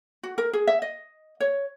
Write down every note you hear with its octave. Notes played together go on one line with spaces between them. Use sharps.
F#4
A#4
G#4
E5
D#5
C#5